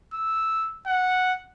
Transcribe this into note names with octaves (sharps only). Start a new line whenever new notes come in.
E6
F#5